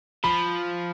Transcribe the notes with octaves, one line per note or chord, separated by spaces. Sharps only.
F3 B5